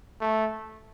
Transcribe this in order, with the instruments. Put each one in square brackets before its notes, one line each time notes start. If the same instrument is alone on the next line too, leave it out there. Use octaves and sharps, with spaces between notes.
[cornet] A3